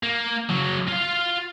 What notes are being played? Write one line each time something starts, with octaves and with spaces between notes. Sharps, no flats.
A#3
C#3 F#3
F4 F5